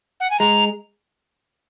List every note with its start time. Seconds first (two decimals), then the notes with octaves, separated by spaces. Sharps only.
0.20 F#5
0.30 G#5
0.40 G#3 A#5